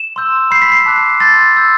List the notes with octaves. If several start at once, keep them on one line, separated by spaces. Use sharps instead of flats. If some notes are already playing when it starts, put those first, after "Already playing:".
Already playing: E7
C6 E6 G6
B5 E6 G6 C7
B6
C7
A5 D6 F#6
A5 C6 E6 G6 A6
C6 E6 G6